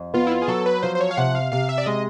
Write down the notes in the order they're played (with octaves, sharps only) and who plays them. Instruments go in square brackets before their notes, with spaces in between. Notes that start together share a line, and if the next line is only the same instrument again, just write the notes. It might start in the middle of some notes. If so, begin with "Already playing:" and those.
Already playing: [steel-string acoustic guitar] F2
[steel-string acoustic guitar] B3 [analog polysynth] F4
[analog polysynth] E4
F4
G#4
[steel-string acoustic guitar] F#3 [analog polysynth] A4
[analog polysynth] B4
[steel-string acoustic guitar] F3 [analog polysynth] C5
[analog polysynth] C5
C#5
F5
[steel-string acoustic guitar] C3 [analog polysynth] F#5
[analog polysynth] F5
[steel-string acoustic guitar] C3 [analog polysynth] F5
[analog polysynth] E5
D5
[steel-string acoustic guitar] G#3 [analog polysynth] D#5